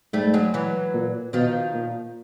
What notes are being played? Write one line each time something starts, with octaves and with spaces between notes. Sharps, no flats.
G#2 G3 A3
F#3 G#3
E3 F#3
A#2
B2 D#3 F3
A#2